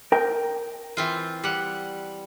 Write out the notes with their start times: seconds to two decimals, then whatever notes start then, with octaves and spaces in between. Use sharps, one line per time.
0.12 A#4 G5
0.97 E3 C4 F4
1.43 G3 F#5